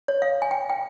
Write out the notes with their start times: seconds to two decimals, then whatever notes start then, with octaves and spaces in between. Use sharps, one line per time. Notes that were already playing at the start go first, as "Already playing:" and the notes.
0.08 C#5
0.22 F5
0.42 G#5
0.51 G5
0.70 G5